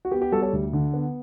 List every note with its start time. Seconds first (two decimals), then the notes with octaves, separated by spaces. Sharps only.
0.05 F#4
0.11 B3 G4
0.22 G4
0.32 G3 F#4 A4
0.42 A4 C#5
0.53 D2
0.73 D3
0.94 B3